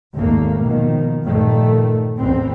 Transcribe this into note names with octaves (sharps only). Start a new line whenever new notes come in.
G#1 D#2 A3 A#3
B2 D#3 F3
G2 A#2 D#3 F3 A3
A1 E2 E3 C4